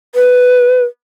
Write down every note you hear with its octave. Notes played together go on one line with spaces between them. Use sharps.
B4